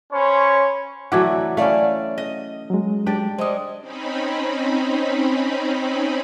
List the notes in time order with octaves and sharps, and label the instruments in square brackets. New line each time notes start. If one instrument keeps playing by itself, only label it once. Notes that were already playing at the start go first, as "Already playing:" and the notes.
[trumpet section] C#4 C5 C#5 B5
[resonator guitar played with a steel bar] D3 [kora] E3 F#3 A3 [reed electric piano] F#5 D6 G#6
[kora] A3 C#4 [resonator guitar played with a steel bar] E4 D5 F5
[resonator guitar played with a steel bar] D#5
[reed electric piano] F#3 G#3
[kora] D4 G4 D5
[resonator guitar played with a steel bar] G3 G#3 [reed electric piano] C5 D#5 D#6
[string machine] C4 C#4 D#4 B5